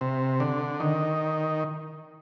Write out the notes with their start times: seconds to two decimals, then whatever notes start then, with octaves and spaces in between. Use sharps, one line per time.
0.01 C3
0.40 D3
0.80 D#3